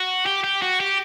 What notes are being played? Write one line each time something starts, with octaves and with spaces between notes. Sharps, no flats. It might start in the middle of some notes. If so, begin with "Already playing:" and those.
Already playing: F#4
G4
G4
F#4
G4